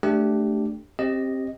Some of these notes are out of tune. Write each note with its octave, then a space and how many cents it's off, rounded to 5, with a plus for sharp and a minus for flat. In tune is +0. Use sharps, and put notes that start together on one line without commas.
A3 -5 D4 +0 G4 -5
C4 +20 G4 +0 D#5 +0